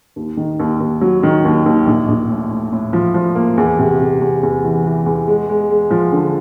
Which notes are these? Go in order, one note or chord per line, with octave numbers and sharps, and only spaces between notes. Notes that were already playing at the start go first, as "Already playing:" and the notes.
D#2
D#3
D#2
D#2
F#3
D#3
D#2
D#2
A#1
A#1
A2
A2
A2
F3
F3
A#3
E2
C3
C3
E2
E2
E3
E3
E2
G#3
G#3
G#3
F3
D3